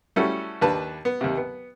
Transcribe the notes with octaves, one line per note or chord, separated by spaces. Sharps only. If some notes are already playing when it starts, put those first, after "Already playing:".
G3 A3 C#4 E4 F#4 A4
D#2 D4 B4 A5
B3
D#2 C3
B3